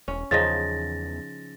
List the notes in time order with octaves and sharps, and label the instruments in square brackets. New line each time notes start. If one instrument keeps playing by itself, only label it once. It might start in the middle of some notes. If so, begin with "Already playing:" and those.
[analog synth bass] E1 [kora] C#4
[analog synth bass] E2 [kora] C#3 F3 D#4 [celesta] A6 A#6